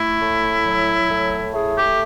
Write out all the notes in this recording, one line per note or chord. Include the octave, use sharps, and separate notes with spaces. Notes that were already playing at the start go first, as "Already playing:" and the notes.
Already playing: A3 E4
A2
F#3
A2
A3 G#4
G4